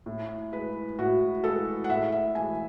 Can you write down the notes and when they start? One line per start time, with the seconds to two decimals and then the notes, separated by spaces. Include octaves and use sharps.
0.06 A2
0.52 G#3 B4
0.99 A2 F#4
1.44 G#3 A4
1.84 F#5
1.89 A2 E5
2.12 E5
2.35 E3 G#3 G#5